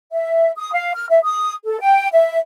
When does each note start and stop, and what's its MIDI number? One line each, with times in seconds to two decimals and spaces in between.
0.12 0.51 76
0.57 0.72 87
0.73 0.92 77
0.95 1.05 89
1.10 1.18 76
1.23 1.53 87
1.64 1.79 69
1.80 2.07 79
2.12 2.37 76